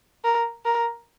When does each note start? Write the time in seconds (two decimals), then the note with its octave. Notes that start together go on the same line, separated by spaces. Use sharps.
0.24 A#4
0.65 A#4